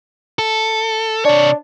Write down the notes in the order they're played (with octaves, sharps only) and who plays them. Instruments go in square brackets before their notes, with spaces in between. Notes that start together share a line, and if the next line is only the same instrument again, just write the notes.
[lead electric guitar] A4
[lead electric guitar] C3 C#5 [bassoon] D4